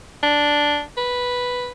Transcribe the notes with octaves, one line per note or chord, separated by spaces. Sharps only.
D4
B4